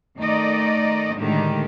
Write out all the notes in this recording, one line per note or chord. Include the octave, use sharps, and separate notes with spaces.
D#3 A3 D#4 D5 D#5
A2 D3 D#3 G#3 A3 G4